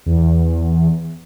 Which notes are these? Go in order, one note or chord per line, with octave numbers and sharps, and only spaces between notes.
E2